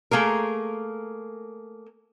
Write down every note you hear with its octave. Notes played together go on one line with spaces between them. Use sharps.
A3 A#3 G#4 A#4